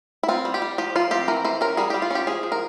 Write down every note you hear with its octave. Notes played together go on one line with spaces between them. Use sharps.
E4
C4 F4
G3
G4
G3
F3 G4
F3 F4
C4 G4
E3 A#4
E3 C5
C#4 A#4
G3 G#4
G3 G4
F4
C#4 G4
F3 G#4
F3
A#4